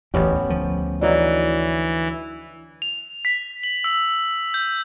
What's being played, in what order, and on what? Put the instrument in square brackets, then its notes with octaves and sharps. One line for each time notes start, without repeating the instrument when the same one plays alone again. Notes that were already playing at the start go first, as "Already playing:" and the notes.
[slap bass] D1 A1 E2 [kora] B3 C#4 G4
[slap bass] D2 F3
[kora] D3 F#3 D#4 [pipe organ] E3
[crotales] F7
B6
F#7
E6
G6